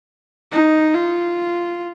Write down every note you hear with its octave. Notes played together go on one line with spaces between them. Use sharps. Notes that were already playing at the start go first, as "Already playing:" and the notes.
D#4
F4